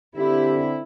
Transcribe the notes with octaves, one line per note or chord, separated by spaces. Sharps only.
D3 C4 E4 G4